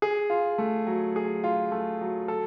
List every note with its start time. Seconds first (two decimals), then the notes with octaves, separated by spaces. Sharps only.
0.02 G#4
0.30 F4
0.58 A3
0.87 F#3
1.16 G#4
1.44 F4
1.72 A3
2.01 F#3
2.28 A4